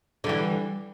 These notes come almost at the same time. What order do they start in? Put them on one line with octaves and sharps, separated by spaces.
D3 G3 E3